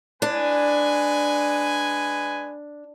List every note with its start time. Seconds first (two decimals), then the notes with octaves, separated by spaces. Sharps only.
0.22 G#3 D4 B4 G#5